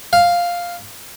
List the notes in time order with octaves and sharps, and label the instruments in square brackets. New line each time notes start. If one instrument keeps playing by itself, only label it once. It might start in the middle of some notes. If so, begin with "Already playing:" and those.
[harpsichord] F5